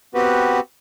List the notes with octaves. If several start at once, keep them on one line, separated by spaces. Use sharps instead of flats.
B3 C4 F#4 G4 B4